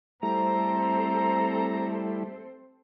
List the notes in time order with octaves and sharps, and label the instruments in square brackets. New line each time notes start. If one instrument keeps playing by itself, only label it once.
[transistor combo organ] G3 A3 E4 [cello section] C4 A4 C5 [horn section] A#5